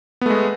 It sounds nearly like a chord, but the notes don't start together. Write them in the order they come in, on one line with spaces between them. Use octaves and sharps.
B3 A3 G#3